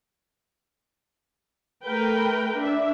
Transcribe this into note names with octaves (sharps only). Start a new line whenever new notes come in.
A3 A#4 B4 G5
D4 E5